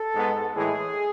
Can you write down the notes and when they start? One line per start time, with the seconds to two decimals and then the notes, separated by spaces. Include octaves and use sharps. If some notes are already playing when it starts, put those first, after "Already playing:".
Already playing: A4
0.15 G#2 G#3 B3
0.55 A2 E3 G#3 G#4